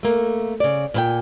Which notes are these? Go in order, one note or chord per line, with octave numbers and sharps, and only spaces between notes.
A3 A#3
C#3 D5
A#2 B4 G5